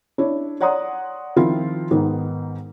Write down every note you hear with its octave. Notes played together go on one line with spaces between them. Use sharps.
D4 E4 C#5
C#5 D5 F#5 A#5 C6 D#6
D#3 F3 C4 E4 F4
G#2 D#3 B3 D#4